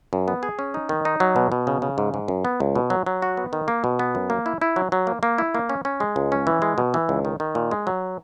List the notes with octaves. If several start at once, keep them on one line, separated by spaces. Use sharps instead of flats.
F#2
B3
G#4
C#4
D#4
D#3
D#4
F#3
B2
B2
C#3
C#3
G#2
G#2
F#2
B3
C#2
B2
F#3
F#3
F#4
B3
D#3
A#3
B2
B3
F#2
A#3
E4
E4
F#3
F#3
A#3
A#3
E4
A#3
C#4
C#4
G#3
C#2
C#4
E3
G#3
B2
E3
C#2
D#3
D#3
A#2
G#3
F#3